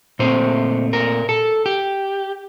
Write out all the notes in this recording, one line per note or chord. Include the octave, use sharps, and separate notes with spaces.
A#2 A3 C4 C5
A#4
A4
G4